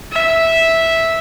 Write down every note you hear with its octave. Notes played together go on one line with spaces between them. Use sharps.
E5